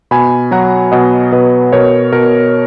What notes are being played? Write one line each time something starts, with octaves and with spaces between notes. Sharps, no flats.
B2 G#5 B5
F#3 F#5 A#5
B2 D#5 F#5
B2 B4 D#5
B2 A#4 C#5
B2 A#4